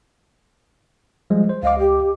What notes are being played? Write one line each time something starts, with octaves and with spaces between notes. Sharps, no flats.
F3 G3 G#3
C5
C#2 D#5 F5 D6
G4